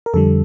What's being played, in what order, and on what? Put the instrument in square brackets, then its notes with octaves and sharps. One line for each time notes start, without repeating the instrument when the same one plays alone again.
[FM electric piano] A#4
F2 D3 G3 A4